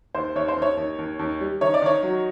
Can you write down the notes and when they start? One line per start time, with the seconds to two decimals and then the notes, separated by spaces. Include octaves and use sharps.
0.15 D#2 C5
0.35 D#2 C#5
0.48 C5
0.57 D#2 C#5
0.77 D#2
0.98 D#2
1.19 D#2
1.41 G3
1.61 D#3 C#5
1.74 D5
1.82 D#3 C#5
2.03 F#3